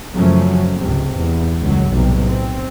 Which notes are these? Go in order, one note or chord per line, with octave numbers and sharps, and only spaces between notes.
F#2 C#3 F3 F#3 A3 C#4
C#2 G#2 C3
E2
C#2 F#2 F#3
B1 A2 C3 G3
C4